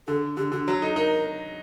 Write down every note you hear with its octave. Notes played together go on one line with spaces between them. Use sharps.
D3 A4
D3 G4
D3 F#4
F#3 F#4
D#4 A4
D#4 A#4